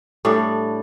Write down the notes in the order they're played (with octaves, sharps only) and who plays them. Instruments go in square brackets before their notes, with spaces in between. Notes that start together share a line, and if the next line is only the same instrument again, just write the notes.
[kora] A2 G3 D4